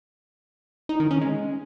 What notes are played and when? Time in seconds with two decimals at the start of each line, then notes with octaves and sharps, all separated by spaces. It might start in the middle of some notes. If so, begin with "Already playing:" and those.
0.89 D#4
1.00 D#3
1.11 C#4
1.21 G#3